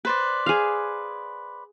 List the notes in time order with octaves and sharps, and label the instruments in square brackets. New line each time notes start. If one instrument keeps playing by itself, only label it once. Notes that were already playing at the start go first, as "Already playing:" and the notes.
[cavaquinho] B4 C5 D5
[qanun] G#4 F5